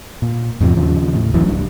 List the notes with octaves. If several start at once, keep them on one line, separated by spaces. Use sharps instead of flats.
A#2
E2 G#2 C3 F3
D#2 C#3 F3
A2
D1 A1 F#2 E3
C2 G2